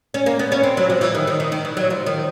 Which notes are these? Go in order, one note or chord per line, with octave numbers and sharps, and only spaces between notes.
C#4
A#3
B3
C#4
C4
F#3
F3
E3
D#3
D#3
D#3
D#3
E3
F#3
F3
D#3